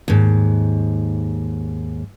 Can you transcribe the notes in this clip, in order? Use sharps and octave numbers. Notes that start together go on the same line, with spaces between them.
D#2 G#2